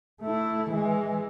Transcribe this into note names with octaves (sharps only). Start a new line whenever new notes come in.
A3 E4
E3 G#3